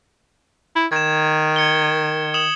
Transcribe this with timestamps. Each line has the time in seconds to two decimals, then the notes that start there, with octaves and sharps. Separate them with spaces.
0.76 E4
0.92 D#3 G#6 E7
1.56 G#6 C#7 G7
2.34 D#6 E7 F#7